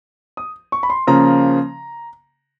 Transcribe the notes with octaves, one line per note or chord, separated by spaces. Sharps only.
D#6
C#6
B5
C6
C#3 F3 A#3 A#5